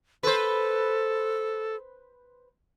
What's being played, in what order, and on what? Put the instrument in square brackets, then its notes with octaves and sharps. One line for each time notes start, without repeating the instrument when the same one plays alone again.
[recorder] A4 [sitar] B4 C5